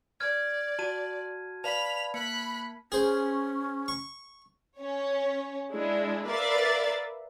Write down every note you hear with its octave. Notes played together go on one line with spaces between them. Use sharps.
D5 F6 G#6
F#4 A5 D#7
B4 D5 F5 A5 B5 B6 F7
A#3 B5 F#6 C#7
C#4 G#4 C5
C#6
C#4 C#5
G#3 D4 E4
A#4 B4 D5 E5 F5 A6